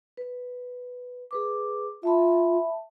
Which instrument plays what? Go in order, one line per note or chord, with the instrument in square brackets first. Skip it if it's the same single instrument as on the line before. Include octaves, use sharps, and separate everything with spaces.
[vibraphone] B4
G#4 B4 D6
[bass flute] F4 [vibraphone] E5 A5 B5